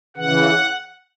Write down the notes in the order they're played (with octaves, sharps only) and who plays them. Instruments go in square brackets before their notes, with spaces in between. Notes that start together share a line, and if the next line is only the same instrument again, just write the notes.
[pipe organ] C#3 E3 F#5